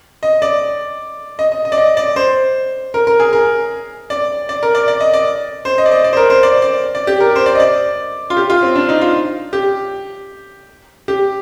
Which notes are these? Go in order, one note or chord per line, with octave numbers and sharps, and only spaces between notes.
D#5
D5
D#5
D#5
D#5
D5
D#5
D5
C5
A#4
A#4
G#4
A#4
D5
D5
A#4
D5
D5
D#5
D5
C5
D#5
D5
D#5
D5
C5
A#4
C5
D5
D5
D5
G4
A#4
C5
D5
D#5
D5
F4
G4
F4
C4
D4
D#4
F4
G4
G4